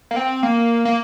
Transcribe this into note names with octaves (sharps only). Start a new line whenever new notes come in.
A#3
C4
A#3
A#3